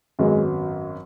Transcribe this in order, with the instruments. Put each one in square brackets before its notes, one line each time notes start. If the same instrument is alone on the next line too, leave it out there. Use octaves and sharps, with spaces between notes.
[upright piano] G#1 F#2 F#3 B3 [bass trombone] G#3